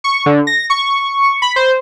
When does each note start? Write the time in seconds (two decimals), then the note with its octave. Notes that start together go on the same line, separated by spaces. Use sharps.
0.04 C#6
0.26 D3
0.47 A#6
0.70 C#6
1.42 B5
1.56 C5